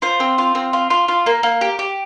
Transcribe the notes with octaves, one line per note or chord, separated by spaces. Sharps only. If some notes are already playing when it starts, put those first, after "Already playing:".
F4 C5
C4
F4
C4
F4
F4
F4
A#3
A#3
G4
G4